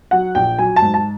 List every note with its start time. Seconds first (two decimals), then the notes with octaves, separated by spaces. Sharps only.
0.11 F#3 F#5
0.35 A#1 G5
0.59 F#3 G#5
0.76 A5
0.82 G#2
0.94 A5